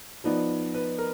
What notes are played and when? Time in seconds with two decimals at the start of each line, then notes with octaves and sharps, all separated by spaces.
0.24 F3 B3 D#4 D5
0.75 B4
0.98 A#4